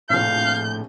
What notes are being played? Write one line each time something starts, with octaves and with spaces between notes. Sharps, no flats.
F1 A#1 A2 F5 G6